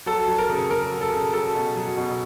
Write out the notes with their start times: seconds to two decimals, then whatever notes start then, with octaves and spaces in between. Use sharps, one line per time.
0.06 F#3 A4
0.28 F#3
0.38 A#4
0.49 C#3
0.70 C#3 A#4
0.92 F#3
1.01 A4
1.13 C#3
1.33 F#3 A4
1.55 B2
1.76 F#3
1.97 B2